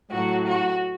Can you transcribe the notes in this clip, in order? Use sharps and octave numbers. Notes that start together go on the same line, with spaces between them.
A2 F#3 F#4
F#4